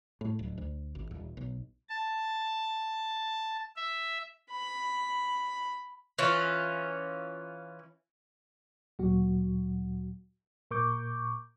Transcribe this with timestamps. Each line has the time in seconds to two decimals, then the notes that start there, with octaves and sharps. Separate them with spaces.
0.21 A2
0.39 D1
0.58 D2
0.95 G#1
1.11 D#1
1.37 B1
1.89 A5
3.77 E5
4.52 B5
6.19 E3 C#4 F4
8.99 D2 A#2 F#3 F#4
10.71 A#2 A#4 C#6 D6 G6